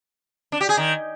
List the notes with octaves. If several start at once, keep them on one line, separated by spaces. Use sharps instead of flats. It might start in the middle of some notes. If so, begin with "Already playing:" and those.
D4
G4
G#4
D#3